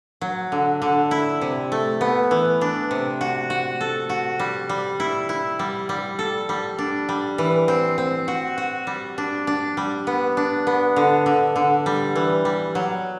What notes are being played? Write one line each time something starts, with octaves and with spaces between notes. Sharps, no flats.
F#3
D3
D3
E4
C3
A3
B3
E3
D4
C3
F#4
F#4
A4
F#4
G3
G3
E4
E4
G3
G3
A4
G3
D4
G3
E3
C4
C4
F#4
F#4
G3
D4
D4
G3
B3
D4
B3
D3
D3
D3
G3
E3
G3
F#3